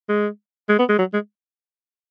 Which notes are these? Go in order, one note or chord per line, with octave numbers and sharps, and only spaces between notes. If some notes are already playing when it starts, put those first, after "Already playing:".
G#3
G#3
B3
G#3
F#3
G#3